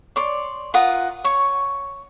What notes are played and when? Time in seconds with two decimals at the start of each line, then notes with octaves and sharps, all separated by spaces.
0.16 C#5 D5 C6
0.74 F4 A#4 F#5 D#6
1.24 C#5 C#6